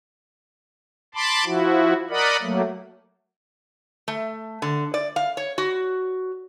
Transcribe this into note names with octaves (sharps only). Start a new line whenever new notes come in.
A5 B5 C6 D6
F3 E4 F#4
A#4 D5 D#5 F#5 B5
F#3 A3 A#3
A3
D3
D5
F5
C#5
F#4